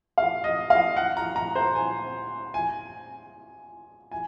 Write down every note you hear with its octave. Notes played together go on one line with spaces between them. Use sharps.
F5
D#5
F5
F#5
A#5
A#5
C5
G#5
G#5
G#5